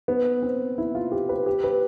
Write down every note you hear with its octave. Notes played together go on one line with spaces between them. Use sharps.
B3
C4
E4
F4
G4
B4
G4
B4